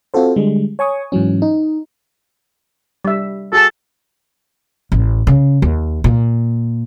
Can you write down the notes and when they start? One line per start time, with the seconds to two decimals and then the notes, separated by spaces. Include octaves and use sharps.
0.14 C4 F4 F#4 A4 C5
0.36 D3 G3 G#3
0.79 C#5 G#5 C#6 D#6
1.12 G#2 E3 F#3 C#4
1.42 D#4
3.05 G3 E5
3.53 F#4 G#4 A4 A5
4.92 A1
5.27 C#3
5.62 D#2
6.04 A#2